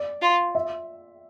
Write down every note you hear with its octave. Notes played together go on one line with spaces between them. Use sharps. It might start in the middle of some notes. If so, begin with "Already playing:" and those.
Already playing: D5
F4
E5